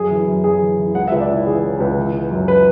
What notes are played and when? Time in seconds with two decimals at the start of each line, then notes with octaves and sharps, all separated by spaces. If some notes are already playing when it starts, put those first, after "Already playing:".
Already playing: F#2 G#4
0.10 E3
0.27 F#2
0.44 F#2 G#4
0.61 E3
0.78 E3
0.95 C#2 F#5
1.08 E5
1.12 C#2
1.20 D5
1.29 C#3 E4
1.46 E3 G#4
1.64 C#3
1.80 C#2
1.97 E3
2.14 E3
2.31 F#2
2.48 B4